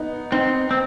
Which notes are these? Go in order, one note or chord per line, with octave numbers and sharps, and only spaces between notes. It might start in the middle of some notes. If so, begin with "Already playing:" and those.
Already playing: B3 D#4
C4 D#4
C4